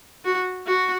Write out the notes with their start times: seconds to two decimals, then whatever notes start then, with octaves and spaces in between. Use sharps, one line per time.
0.25 F#4
0.67 F#4